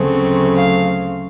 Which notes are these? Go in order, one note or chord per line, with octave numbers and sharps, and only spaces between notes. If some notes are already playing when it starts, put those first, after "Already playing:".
Already playing: D2 C#3 F#3 A3 C4
F5